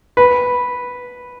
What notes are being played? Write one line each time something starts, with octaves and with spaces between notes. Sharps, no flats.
B4